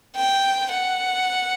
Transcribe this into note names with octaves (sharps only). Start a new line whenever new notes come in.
G5
F#5